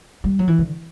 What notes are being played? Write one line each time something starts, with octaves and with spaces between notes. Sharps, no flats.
G3
F#3
E3
D3